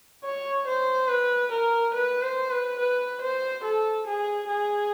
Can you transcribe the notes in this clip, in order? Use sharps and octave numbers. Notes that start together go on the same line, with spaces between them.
C#5
C5
B4
A#4
B4
C5
B4
B4
C5
A4
G#4
G#4